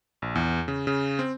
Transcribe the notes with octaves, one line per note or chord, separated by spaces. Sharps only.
A#1
E2
C#3
C#3
C4